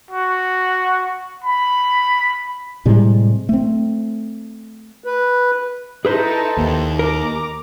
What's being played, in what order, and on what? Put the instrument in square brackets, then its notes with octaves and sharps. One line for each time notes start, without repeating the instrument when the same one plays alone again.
[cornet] F#4
B5
[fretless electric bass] A2 C3 G3 G#3
A3 C4
[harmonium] B4
[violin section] D#4 E4 A4 [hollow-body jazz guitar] G#4 B4 C5
[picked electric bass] D#2
[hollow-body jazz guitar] A#4 [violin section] A#5 D6